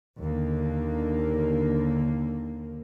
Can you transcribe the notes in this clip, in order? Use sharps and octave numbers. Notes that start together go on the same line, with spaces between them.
D#2 D3 A#3